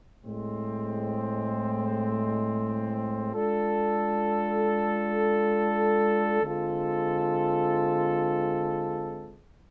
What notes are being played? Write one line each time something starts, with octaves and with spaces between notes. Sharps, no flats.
A2 G#3 C4
G#3 D4 F4 A4
D3 G#3 C4 F4 A4